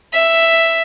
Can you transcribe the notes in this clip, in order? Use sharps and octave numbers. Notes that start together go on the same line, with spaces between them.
E5